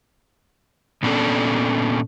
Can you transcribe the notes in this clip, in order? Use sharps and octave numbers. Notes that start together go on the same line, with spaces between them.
A#2 B3 C#4 D4 A4